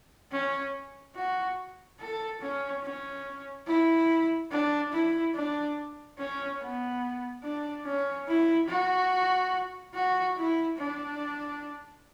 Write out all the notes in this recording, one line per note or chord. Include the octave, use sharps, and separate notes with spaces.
C#4
F#4
A4
C#4
C#4
E4
D4
E4
D4
C#4
B3
D4
C#4
E4
F#4
F#4
E4
D4